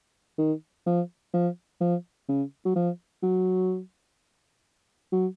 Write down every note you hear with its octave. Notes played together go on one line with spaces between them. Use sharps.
D#3
F3
F3
F3
C#3
F#3
F3
F#3
F#3